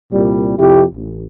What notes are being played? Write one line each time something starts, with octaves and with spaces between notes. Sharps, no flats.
C2 A#2 G3
F2 C3 E4 G4
A1